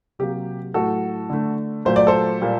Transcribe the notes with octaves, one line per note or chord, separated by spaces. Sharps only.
C3 F#3 A#3 G4
A2 F#3 A3 F#4 A4
D3 A3
A#2 F#3 A3 C5
D5
A4 C5
A#2 G3 A#3